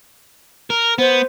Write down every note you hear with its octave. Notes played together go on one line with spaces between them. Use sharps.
A#4
B3 C5